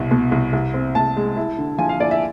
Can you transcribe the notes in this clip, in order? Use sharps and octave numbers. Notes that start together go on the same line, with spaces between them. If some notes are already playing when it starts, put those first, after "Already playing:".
Already playing: C2 B2
B2
C2
C2
C4
C2 A5
G#3
E4
D3
F3 G#5
F5
E4 D5
E5